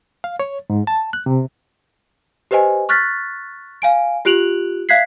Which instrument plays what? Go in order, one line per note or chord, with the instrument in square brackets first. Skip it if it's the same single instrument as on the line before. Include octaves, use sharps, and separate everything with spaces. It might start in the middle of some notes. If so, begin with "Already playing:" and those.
[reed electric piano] F5
C#5
G#2
A5
F#6
C3
[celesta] G4 B4 C5 D#5 G#5
C#6 F6 F#6 A6 B6
F5 G#5 D7
F4 G4 F#6 D7 F7 F#7
E5 F5 F#6 G#6 B6 C7